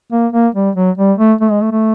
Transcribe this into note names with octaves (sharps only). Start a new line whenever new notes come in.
A#3
A#3
G3
F#3
G3
A3
A3
G#3
A3
A3